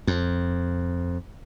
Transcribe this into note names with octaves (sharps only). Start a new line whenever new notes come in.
F2